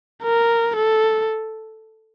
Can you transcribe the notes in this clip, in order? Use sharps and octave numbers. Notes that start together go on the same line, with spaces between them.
A#4
A4